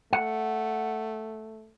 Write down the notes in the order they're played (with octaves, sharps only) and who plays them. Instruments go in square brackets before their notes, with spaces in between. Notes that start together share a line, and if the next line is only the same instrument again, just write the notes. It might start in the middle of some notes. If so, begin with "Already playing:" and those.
[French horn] A3 [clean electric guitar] F#5